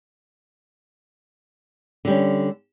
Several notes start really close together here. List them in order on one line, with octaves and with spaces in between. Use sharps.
D3 G3 C#4